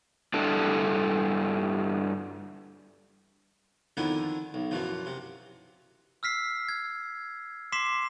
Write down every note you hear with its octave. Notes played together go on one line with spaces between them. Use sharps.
G2 D4 E4 A4
F2 D3 D#3 F3 B3 E4
B1
F#2 B2 E3 F3
C3
E6 F6 B6 C7
G#6
C6 D6 B6 C7 E7